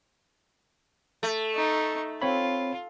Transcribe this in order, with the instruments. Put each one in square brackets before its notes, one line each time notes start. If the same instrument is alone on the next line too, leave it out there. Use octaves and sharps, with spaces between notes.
[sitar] A3
[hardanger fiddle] D#4 C#6
[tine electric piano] C4 C#5 B5 [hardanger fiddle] F4